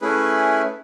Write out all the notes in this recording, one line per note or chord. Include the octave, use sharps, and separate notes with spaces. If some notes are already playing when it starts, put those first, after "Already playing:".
A3 C#4 E4 G#4 B4